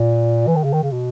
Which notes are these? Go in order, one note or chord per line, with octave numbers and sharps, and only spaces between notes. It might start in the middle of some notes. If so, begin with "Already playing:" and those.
Already playing: A#2
E3
D#3
C#3
D#3
C#3
B2